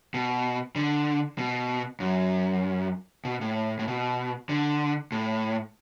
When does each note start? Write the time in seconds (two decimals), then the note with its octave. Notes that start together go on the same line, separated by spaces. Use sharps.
0.14 B2
0.76 D3
1.38 B2
2.00 F#2
3.25 B2
3.41 A2
3.79 A2
3.88 B2
4.49 D3
5.12 A2